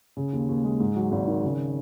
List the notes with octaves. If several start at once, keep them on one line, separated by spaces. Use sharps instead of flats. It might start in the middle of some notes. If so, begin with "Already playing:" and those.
C#3
D#2
D#2
G#3
G#2
F#3
G#1
D#3
C#3